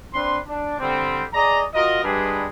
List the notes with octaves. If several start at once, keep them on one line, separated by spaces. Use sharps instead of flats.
C4 D4 B4 C6
D4
D3 G3 C4
G#4 D5 D#5 A#5
F4 F#4 A#4 D#5
G2 G3 G#3 D4 G#4 B4